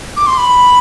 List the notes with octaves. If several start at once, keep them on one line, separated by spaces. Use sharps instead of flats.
D6
C6
B5